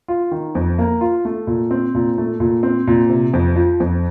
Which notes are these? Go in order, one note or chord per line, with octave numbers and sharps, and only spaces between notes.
F4
D#3
F2
A#3
F4
A3
A#2
C4
A#2
A3
A#2
C4
A#2
C3
F2
F3
F2